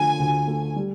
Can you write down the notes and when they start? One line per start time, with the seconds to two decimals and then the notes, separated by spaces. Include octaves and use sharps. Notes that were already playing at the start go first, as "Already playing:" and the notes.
Already playing: D3 F3 A3 G#5
0.19 D2
0.48 A3
0.76 G3